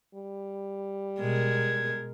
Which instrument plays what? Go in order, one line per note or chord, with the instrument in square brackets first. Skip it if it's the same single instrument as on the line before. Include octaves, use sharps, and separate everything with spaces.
[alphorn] G3
[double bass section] B2 [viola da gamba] G#3 A#4 [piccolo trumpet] G#6